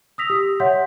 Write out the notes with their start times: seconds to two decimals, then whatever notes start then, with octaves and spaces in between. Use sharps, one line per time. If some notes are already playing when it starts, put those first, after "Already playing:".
0.18 D#6 E6 A#6 B6 F7
0.30 G4
0.60 C#5 E5 F#5 C6 G6 B6